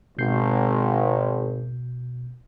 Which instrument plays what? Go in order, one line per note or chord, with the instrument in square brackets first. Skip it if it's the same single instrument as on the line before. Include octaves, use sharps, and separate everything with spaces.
[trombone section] G#1 [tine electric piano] B2 G6 C7